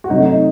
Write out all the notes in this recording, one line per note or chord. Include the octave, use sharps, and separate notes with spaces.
F#4
C3 F#3 A3 D#4
D#4